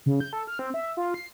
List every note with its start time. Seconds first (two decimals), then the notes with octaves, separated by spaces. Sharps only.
0.06 C#3
0.20 G6
0.33 A4
0.47 F6
0.59 C4
0.74 E5
0.97 F4
1.14 C7